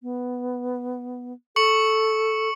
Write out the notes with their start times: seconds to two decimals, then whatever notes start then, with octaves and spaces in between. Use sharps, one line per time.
0.03 B3
1.56 A4 C#6 C#7 F#7